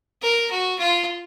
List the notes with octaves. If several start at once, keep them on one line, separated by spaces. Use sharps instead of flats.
A#4
F#4
F4